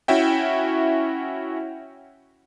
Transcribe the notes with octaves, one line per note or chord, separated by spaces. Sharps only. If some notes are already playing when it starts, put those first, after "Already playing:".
C#4 E4 F#4 E5 G5